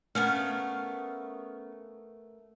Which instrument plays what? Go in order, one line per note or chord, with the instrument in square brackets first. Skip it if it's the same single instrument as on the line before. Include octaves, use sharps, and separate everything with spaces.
[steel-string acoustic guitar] A3 A#4 [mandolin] B3 C#4 F5